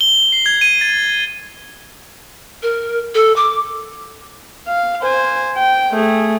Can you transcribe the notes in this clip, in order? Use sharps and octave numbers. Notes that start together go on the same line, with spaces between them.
G7
C7
G#6
D#7
A6
A#4
A4
D6
F5
C5 G#5
G5
A3 G#4